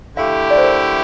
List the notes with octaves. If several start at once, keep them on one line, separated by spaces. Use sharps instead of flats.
D3 A3 E4 G4 F5
D5
C5
A#4